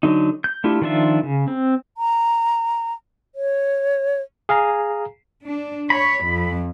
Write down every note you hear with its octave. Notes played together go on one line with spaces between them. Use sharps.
D3 F#3 D#4
G6
A3 D4 E4 F4 G4
D#3 F3 D4 F4 E5
C#3
C4
A#5
C#5
G#4 F5 G#5 A#5
D4
C#5 B5
F2